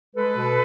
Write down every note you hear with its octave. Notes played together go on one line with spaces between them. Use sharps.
G#3 A4 B4
B2